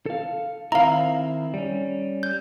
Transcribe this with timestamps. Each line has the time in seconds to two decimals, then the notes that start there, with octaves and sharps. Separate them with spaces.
0.06 A4 F5
0.72 D#3 C4 E4 F5 A#5
1.54 G3 C#4
2.23 G6